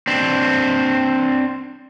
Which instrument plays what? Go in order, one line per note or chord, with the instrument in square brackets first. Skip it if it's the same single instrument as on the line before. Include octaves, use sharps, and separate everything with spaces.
[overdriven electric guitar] C4 D4